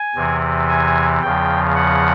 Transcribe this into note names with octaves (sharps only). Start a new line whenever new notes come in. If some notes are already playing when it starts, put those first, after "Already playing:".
Already playing: G#5
E2 C3 E3
G#5
E2 C#3 F3 G5
F#5